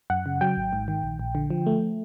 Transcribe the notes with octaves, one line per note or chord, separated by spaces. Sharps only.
F#2 F#5
C#3
F#3 G5
G#1
G#2
D#3
A#1
A#1
D3
F3
A3